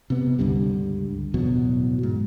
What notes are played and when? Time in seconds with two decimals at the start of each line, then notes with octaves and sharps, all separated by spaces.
0.10 C3 B3
0.39 C#2 G2 D3 G3
1.34 D1 E2 B2 F#3
2.03 G#2